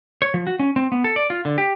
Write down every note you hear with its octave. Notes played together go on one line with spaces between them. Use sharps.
C#5
F3
F#4
C#4
C4
B3
A4
D5
F4
D3
G4